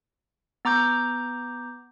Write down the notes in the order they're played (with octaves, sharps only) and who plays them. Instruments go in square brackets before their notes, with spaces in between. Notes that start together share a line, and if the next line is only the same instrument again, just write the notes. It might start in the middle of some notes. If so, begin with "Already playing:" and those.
[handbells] B3 A#5 D6 G6